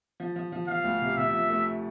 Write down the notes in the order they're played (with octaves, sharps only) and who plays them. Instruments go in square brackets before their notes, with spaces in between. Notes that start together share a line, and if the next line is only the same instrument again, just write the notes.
[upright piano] F3
F3
F3
[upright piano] F3 [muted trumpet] F5
[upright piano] D2
C3
[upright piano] C3 [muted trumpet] E5
[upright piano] F3
A3